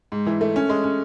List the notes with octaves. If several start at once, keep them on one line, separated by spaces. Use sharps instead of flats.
G#2
E3
A3
C#4
G#3
C#4